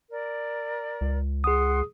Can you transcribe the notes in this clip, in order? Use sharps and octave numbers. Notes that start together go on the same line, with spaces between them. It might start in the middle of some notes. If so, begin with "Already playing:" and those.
A#4 D5
C#2
G#4 F#5 C6 D#6